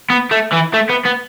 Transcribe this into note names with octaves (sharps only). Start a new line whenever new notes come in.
B3
A3
E3
A3
B3
B3